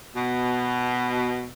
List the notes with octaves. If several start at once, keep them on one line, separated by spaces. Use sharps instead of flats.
B2